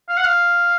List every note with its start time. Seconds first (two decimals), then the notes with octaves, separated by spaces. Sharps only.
0.08 F5
0.17 F#5
0.25 F5